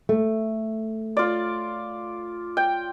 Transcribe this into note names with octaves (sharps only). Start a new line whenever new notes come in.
A3
F4 D5
G5